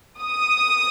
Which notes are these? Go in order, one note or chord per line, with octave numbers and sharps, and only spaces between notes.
D#6